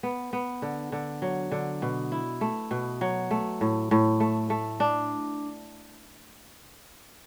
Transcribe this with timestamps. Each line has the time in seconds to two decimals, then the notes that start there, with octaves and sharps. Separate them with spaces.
0.03 B3
0.33 B3
0.62 D3
0.92 D3
1.22 F#3
1.52 D3
1.82 B2
2.12 E4
2.41 A3
2.71 B2
3.01 F#3
3.31 A3
3.61 A2
3.91 A2
4.20 A3
4.50 A3
4.80 D4